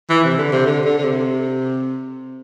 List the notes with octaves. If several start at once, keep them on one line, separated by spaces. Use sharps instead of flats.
E3
C3
D3
C3
D3
D3
D3
C3